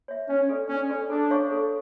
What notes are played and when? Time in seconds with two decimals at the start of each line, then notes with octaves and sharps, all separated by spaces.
0.08 C#5 E5
0.28 C#4 D4
0.49 A4 D5
0.69 C#4 D4
0.90 A4 D5
1.10 D4 A4
1.31 C#5 F5 C#6
1.51 A4